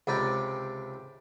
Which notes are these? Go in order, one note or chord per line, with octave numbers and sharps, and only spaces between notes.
C#2 C3 B4 D5 G5 A#5